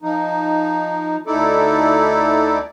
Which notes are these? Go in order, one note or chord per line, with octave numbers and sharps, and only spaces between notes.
F3 D#4
D2 D#4 E4 A4 D5